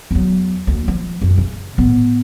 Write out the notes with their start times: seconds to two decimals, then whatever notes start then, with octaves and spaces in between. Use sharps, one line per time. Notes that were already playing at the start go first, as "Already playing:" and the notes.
0.11 E2 F#3
0.67 D2 A#3
0.88 F3
1.21 F#2 E3
1.38 C#3
1.78 A2 B3